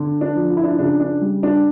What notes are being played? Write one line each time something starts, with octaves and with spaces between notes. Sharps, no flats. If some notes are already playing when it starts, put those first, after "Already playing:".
Already playing: D3
D4
F3
F4
E4
D4
E4
C#3 D4
D4
G3
D4